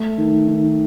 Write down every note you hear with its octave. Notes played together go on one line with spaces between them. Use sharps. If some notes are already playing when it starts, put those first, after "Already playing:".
Already playing: A3
D#3
D#3